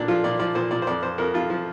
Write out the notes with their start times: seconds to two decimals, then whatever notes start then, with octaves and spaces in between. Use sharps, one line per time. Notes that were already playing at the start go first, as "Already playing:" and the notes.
Already playing: A#2 D4
0.08 F3 F4
0.24 A#2 D5
0.39 F3 D5
0.55 A#2 C5
0.71 A#2 D5
0.82 C5
0.87 F2 D5
1.02 F2 C5
1.18 F2 A#4
1.34 F2 F4
1.50 F3